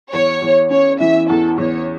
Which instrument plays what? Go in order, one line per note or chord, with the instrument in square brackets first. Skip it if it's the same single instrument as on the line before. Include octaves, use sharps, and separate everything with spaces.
[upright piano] E2 [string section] C#5
[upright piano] E2
[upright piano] C#4 [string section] C#5
[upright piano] E3 [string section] E5
[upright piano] E2 [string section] A4
[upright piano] E2 [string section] C#5